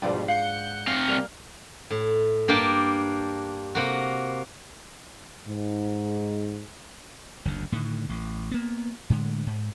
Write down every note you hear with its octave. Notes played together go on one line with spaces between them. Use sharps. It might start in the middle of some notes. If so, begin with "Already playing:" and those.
G#2 B2 F3 G3 D4 F4
F5 F#5 G6 C#7
C3 F5
G3 A#3 F6 F7
A2
G2 A#3 D4 G4 D5
C3 A#3 F#4
G#2
F#1 D2 D3
A2 D3 D#3
A1
A#3 B3
A2 D3 G#3
G#2